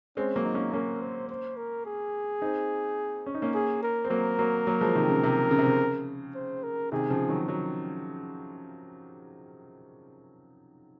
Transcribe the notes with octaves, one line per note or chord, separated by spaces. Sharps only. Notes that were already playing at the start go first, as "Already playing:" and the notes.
G#3 C4 C#4
F#3 A#3
D#4
A#3 C#4
A#3 C#4 A#4
C5
C5
A#4
G#4
C4 D#4
C#4
D#4
A#3 C#4
G#4
A#4
C4
F#3 A#3 A#4
F#3 A#3
F#3 A#3
F3 G#3
C3 D#3
C#3
C3
C#3
C3
C#3
C5
A#4
C3 D#3 G#4
C#3 F3
D#3 F#3
D#3 F#3